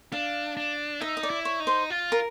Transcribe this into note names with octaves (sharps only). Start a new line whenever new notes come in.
D4 F5
D4
D#4 E5
D#5
D5
E4
C#5
D#4
C5
F4
A#4